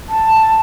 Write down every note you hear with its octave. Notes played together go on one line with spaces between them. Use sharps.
A5